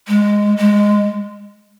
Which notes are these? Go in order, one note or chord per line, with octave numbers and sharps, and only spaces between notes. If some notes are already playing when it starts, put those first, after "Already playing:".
G#3
G#3